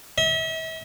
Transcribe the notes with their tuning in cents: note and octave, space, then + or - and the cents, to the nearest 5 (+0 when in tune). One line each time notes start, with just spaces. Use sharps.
E5 -40